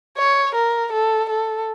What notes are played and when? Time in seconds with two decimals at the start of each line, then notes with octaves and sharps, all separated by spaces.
0.18 C#5
0.55 A#4
0.92 A4
1.29 A4